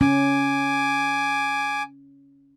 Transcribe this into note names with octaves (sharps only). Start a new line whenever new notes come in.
C#4 G#5 D6